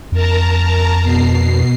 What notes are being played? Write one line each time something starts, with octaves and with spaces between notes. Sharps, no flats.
F2 A#4 A5 A#5
B2 C7